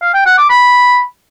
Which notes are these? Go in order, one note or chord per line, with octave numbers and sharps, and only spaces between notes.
F5
G5
F#5
D6
B5